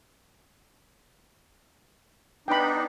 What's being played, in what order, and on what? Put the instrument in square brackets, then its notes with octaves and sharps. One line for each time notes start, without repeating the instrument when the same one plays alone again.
[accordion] B3 D4 D#4 [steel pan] G5 B5